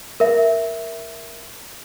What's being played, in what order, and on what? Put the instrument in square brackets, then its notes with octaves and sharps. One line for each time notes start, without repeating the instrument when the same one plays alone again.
[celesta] A#4 E5